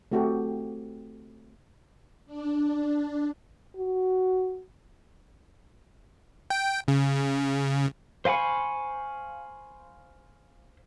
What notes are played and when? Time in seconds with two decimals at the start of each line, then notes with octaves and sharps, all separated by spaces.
0.12 A3 C4 F#4 G4 A4
2.26 D4
3.77 F#4
6.50 G5
6.88 C#3
8.25 C5 F5 G#5 B5 C#6